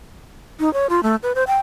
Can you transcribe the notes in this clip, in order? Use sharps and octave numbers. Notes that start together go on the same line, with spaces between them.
D#4
C#5
F4
A3
B4
C5
G5